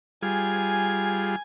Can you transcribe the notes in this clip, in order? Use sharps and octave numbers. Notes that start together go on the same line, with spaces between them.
G3 F4 G#4 G#5